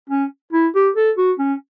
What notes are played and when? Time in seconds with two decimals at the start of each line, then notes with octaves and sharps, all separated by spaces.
0.10 C#4
0.53 E4
0.75 G4
0.96 A4
1.17 F#4
1.39 C#4